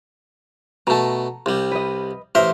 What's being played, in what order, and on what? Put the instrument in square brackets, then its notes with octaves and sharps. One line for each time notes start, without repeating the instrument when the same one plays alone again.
[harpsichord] B2 A3 [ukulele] A5 A#5
[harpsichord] C2 G3
[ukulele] B4 D#5
[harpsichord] A1 A#4 C5 [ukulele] E5